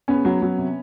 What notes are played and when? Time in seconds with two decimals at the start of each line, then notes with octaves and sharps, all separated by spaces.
0.08 C#3 B3 C#4
0.25 F#3
0.42 F#3
0.58 C3